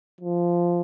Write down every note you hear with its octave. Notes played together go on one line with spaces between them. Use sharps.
F3